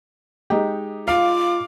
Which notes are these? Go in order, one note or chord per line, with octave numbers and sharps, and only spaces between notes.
G#3 D#4 G4
F4 F5 D6